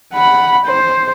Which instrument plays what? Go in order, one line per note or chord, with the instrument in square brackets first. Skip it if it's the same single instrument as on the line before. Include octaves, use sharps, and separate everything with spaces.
[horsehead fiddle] F#5 B5
C5